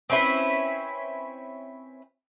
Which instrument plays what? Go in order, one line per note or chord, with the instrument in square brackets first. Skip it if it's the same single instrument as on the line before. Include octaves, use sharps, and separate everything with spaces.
[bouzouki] C4 C#4 E4 B4